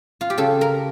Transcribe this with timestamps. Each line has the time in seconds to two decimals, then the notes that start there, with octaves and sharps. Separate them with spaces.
0.21 F4
0.30 G4
0.38 C#3 A4
0.61 A#4